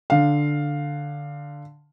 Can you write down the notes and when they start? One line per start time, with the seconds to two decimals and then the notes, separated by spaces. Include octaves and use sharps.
0.10 D3 F5